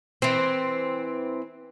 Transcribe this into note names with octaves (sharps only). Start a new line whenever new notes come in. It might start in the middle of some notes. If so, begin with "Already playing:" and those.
E3 C4